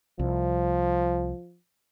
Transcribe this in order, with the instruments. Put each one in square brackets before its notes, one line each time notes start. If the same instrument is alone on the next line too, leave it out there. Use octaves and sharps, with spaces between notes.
[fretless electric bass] C2 [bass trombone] F3